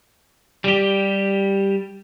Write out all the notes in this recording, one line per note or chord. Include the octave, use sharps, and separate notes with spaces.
G3 G4